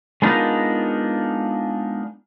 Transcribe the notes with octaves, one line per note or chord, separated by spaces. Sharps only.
G#3 B3 D4 D#4 F4 A#4